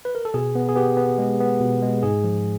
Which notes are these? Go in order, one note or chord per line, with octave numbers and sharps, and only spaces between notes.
B4
A#4
A4
B2 G#4
B3
G#4
B3 G4
B3
G#3
B3
B2
G#3
G#2 G#4
F3